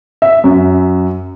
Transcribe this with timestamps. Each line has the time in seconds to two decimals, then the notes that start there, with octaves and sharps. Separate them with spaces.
0.22 E5
0.44 F#2